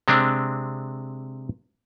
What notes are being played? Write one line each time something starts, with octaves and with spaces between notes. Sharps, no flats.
C3 G#3 C4 D4